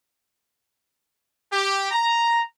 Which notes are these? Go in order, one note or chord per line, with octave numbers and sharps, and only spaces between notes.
G4
A#5